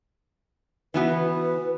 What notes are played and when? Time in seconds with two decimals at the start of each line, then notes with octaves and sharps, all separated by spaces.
0.94 E3 B3 F#4 B4